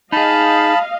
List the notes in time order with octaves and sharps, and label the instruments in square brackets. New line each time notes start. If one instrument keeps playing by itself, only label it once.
[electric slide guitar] D#4 G#4 [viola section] D#5 F5 [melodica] A5 B5